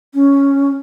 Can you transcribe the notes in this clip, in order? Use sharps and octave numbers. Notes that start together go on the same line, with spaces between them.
C#4